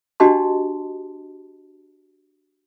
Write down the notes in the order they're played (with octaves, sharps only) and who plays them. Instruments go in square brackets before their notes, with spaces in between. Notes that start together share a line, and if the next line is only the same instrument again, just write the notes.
[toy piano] D4 F#4 G4 D#5 A5 C6